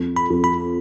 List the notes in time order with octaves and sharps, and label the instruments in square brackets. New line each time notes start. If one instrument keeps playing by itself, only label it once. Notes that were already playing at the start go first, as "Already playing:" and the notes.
Already playing: [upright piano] F2
[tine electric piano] B5
[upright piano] F2
[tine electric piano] B5